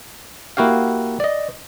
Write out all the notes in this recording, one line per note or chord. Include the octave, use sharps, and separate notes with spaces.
A#3 E4 F#4 G4 F5
D5 D#5